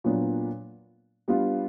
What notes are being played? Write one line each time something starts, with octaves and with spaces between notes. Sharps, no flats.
A#2 F#3 B3 D4
G3 B3 D4 F4